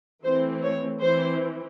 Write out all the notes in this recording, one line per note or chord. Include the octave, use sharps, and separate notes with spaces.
E3 A3 C4 C5
C#5
E3 C4 C5